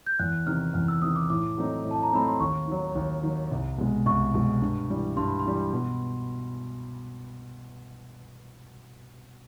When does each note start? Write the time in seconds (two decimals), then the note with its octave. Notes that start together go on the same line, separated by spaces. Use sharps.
0.06 G6
0.19 E2 F#6
0.46 C3 D#3 F6
0.74 E2 F6
0.88 E6
1.02 C3 D#3 D#6
1.16 D6
1.30 A2 D6
1.58 F#3 A3 C4 D#4
1.85 A2
1.91 A5
2.03 A#5
2.12 F#3 A3 C4 D#4 B5
2.28 C6
2.40 D#2 C#6
2.68 D#3 F#3
2.95 D#2
3.23 D#3 F#3
3.51 C2
3.78 B2 G#3
4.06 C2 C#6
4.34 B2 G#3
4.62 G2
4.89 E3 G3
5.17 G2 C6
5.28 B5
5.40 C6
5.45 E3 G3
5.73 B2